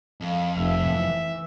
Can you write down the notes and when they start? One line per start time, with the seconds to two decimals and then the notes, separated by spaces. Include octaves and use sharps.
0.21 F2
0.57 F1 E5
0.88 E3